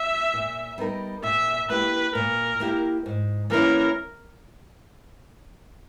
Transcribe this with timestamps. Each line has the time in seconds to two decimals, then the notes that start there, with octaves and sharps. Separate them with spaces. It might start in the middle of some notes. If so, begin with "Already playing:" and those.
Already playing: E5
0.34 A#2
0.78 G3 B3 D#4 A#4
1.23 A#2 E5
1.69 A#3 E4 G4 B4
2.14 A#2 A#4
2.60 A#3 E4 G4
3.06 G#2
3.50 E3 A#3 C#4 E4 A#4